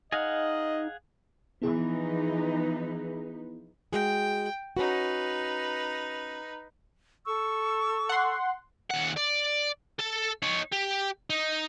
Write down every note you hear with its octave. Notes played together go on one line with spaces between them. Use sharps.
D#4 G#4 D#5 F5 F#5
E3 F3 B3 D#4 E4 G#4 B4
G#3 F#4 G#4 G5
C#4 D#4 F#4 B4
A4 C#6 E6
F#5 C6
D#2 F#5
D5
A4 A5
D#4 C#5
G4
D#4